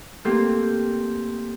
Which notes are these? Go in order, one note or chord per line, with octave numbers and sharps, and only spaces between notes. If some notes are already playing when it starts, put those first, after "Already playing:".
A3 A#3 C4 G4